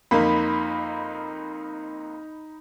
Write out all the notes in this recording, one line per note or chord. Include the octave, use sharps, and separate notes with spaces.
F2 A#3 D#4 B5